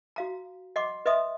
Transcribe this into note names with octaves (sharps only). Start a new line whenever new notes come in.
F#4 F5 A#5
D#5 F#5 C6 D6
B4 D#5 E5 C6 D#6